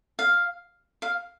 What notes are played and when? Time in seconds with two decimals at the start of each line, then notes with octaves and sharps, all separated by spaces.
0.19 F5
1.02 F5